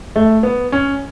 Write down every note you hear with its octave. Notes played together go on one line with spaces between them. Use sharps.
A3
B3
C#4